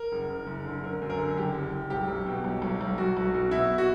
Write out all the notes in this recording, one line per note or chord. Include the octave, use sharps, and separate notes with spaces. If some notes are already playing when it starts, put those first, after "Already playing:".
Already playing: A#4
F#1
F#1
F#1
D3
D3 A#4
F#2
A#4
D3
F#1 G4
F#1
F#1
B1 G4
B1
B2
B1
B1
B1
B1 F#4
B1
B2
B2 E4
F#4